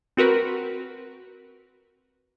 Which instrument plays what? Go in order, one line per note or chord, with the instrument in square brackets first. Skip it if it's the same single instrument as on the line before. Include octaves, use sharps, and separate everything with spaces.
[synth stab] C4 F#4 A#4 B4